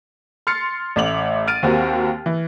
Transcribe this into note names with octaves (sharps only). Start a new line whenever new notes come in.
C6 F6 A6 C7 C#7
A1 A3 E5 D6 F7 F#7
F6 A6 D7 D#7
D#2 C4 F#4 G4 A#4
E3